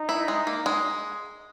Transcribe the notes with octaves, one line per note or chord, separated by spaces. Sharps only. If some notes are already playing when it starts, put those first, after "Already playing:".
Already playing: D#4
E4
G#3
A#3
G#3